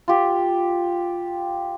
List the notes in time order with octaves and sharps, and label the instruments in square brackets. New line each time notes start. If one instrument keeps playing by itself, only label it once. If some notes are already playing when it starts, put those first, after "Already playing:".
[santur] F4 G4